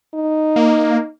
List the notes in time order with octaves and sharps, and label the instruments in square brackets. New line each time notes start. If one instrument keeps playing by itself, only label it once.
[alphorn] D#4
[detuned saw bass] A#3